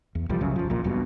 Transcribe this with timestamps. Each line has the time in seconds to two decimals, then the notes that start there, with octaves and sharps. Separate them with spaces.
0.15 E2
0.29 B1 E2 F3 G3
0.41 C2 F#2 C#3
0.56 G1 F3
0.70 A#1 A#2
0.84 F#1 B1 G2 B2